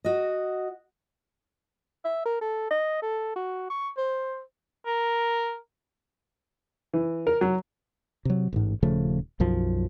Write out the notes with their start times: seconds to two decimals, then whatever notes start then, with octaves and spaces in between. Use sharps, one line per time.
0.05 F#4 D#5
2.05 E5
2.25 A#4
2.41 A4
2.70 D#5
3.02 A4
3.36 F#4
3.70 C#6
3.97 C5
4.86 A#4
6.93 E3
7.27 A#4
7.41 F#3
8.25 C3 F#3
8.53 A1 G#2
8.83 D#1 C#3 F3 A3
9.40 B1 F#2 F3